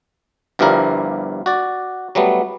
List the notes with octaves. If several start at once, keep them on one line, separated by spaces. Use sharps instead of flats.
G1 G2 F3 G3 E4 A#4
F#4 D5
F#3 G3 A3 B3